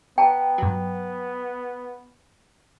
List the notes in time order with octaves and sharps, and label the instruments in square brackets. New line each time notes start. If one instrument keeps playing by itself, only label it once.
[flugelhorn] B3 [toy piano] G5 A5 A#5
[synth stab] G2 F#3